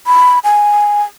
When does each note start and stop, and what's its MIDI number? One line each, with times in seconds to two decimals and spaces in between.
0.07 0.39 83
0.44 1.02 80